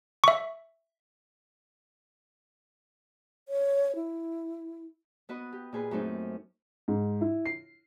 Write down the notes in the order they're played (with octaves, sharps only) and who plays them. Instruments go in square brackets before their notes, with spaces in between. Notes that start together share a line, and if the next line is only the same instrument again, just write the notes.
[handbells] E5 C#6
[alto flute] C#5
E4
[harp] B3 F#4 B4 D#5
G4
A#2 G#4 B4
F#2 A3 C4 D#4
[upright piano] G#2
E4
C7